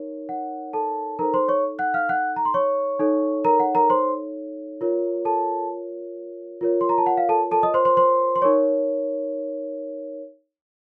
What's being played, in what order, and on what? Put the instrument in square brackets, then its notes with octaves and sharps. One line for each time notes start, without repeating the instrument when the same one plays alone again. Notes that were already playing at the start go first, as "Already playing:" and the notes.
Already playing: [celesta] D#4 A#4 C#5
F#5
A4 A5
D#4 A4 A#4 C5 A#5
C5 C6
C#5 C#6
F#5 F#6
F5 F6
F#5 F#6
A#5
C6
C#5 C#6
D#4 A4 C#5
A#4 A#5
F#5
A#4 A#5
C5 C6
F4 A#4 C#5
A4 A5
F4 A#4 C#5
C6
A#5
A5
F#5
F5
A4 A5
A4 A5
D#5 D#6
C5 C6
C5 C6
C5 C6
C6
D#4 A#4 C#5 C#6